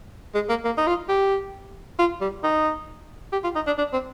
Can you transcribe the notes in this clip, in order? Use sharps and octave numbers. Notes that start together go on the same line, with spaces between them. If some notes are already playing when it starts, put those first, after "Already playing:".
G#3
A#3
A#3
D#4
F4
G4
F4
G3
D#4
G4
F4
D#4
D4
D4
C4